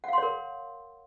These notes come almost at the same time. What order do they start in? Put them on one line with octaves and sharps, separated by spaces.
F#5 F5 C6 C#5 A#4